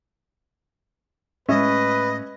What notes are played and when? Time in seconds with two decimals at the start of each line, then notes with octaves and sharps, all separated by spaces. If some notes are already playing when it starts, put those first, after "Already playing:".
1.49 A2 G#3 C#4 B4 D#5 E5